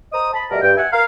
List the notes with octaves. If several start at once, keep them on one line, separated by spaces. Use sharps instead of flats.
C5 D#5 A#5 D#6
A5 B5
B2 G3 A3 A#4
G2 G5
E5 F#5 G#5
A#4 F5